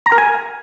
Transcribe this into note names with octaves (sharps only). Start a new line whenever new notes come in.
A#5
A#4
G#5